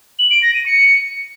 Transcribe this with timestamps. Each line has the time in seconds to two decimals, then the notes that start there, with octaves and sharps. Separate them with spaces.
0.19 F#7
0.31 D7
0.42 A#6
0.54 D#7
0.66 C#7